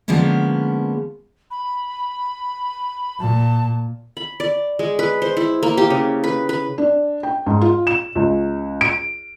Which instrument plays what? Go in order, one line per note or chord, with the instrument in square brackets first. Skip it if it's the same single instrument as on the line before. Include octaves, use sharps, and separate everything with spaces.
[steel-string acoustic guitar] D3 F3 G#3 A#3 B3 C#4
[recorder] B5
[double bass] A#2 [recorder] A5
[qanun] B5
D5
G#3
B4
C5
E4
A#3
G4
C#3
B4
B4
[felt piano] D4
G5
G#2
F4
E7
C#2
D7